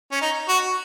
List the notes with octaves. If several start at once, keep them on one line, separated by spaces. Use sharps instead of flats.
C#4
D#4
F#4